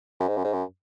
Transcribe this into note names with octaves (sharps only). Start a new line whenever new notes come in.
F#2
G#2
F#2
G#2
F#2